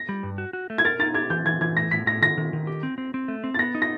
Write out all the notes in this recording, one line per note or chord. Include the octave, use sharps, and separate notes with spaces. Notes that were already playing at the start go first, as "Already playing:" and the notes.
Already playing: A#6
G3
G2
F#4
F#4
A3
G#6
A#4 A6
D#4 A6
G4 G#6
E3 G6
E3 G#6
E3 G#6
A2 A#6
A2 B6
A2 A#6
D#3 A#6
D#3
D#3
G4
C4
C4
C4
A3
C4
A6
B3 A#6
D#4
A#6